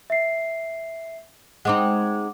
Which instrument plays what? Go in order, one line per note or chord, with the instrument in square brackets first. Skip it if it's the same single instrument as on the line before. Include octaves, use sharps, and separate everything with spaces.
[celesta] E5 C7
[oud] G#3 C4 D#4 [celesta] F#5 D6